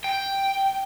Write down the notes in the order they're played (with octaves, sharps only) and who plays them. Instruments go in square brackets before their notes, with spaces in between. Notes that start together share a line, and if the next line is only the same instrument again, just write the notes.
[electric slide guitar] G5